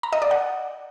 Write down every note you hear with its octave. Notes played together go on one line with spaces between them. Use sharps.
A#5
D#5
D5
F#5